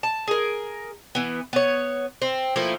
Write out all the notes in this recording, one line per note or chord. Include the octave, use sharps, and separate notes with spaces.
A5
G#4 A#4
E3 B3
B3 C#5
C4
F3 A3 A#3 E4